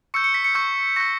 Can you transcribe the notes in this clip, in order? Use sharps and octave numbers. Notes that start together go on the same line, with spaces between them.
C#6 E6 G6 C#7
C#7
B6
C#7
C#6 E6 G6
C#6 G6 A#6